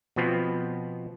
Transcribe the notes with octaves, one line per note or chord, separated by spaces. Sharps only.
B2 F3 B3 C4